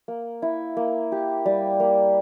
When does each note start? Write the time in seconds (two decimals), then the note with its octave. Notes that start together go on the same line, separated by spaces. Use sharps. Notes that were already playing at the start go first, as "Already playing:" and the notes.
0.08 A#3
0.42 E4
0.77 A#3
1.12 G4
1.46 G3
1.80 A#3